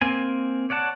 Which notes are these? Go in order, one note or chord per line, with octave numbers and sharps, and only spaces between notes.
A#3 C4 G#5
C#5 D5 F#5 A5